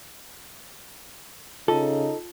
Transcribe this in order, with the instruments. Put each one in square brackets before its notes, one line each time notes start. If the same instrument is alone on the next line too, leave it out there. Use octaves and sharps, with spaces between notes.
[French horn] C#3 [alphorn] D#4 [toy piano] F4 A5 [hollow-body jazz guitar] A4